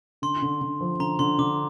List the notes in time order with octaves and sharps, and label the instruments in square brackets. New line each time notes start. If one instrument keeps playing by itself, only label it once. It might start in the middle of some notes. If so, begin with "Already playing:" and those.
[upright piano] D3 [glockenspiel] C6
[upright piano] D3
D3
F3
[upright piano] D3 [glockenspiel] A#5
[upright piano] D3 [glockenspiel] C6
[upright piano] D3 [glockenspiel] D6